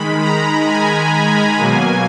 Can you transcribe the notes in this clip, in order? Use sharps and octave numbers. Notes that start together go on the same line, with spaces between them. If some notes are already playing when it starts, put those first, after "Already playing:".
Already playing: D#3 G#3 B5
A#5
G#5
B2 F#3 A#3